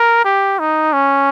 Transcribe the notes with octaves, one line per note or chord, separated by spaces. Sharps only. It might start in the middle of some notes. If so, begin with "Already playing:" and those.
Already playing: A#4
G4
D#4
C#4